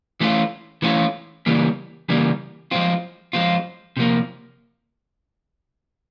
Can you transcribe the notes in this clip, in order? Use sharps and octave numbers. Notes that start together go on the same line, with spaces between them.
E3 A3 C#4 F4
E3 A3 C#4 F4
C#3 E3 G3 A#3
C#3 E3 G3 A#3
F3 G#3 C4 F4
F3 G#3 C4 F4
C3 F3 A#3